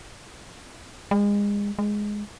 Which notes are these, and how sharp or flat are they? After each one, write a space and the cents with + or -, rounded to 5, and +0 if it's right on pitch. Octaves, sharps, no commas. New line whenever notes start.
G#3 -30
G#3 +0